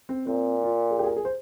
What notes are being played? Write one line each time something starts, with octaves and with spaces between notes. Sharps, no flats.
C4
A#2 C4
F4
G#4
G4
G#4
A#4
G#4
C5